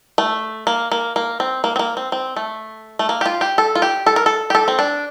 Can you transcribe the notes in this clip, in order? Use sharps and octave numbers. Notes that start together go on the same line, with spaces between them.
A3
A#3
A#3
A#3
C4
A#3
C4
A#3
C4
C4
A3
A3
A#3
G4
F4
G4
A4
F4
G4
A4
A#4
A4
G4
A4
C4
D4